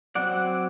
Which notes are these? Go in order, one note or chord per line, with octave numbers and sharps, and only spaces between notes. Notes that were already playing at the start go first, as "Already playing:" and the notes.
F#3 C4 D5 F#5